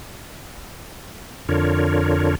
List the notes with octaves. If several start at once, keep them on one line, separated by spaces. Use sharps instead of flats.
F2 D3 D4 F4 A#4 C#5